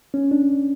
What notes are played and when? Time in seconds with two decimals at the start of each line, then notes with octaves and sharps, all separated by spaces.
0.14 C#4
0.31 D4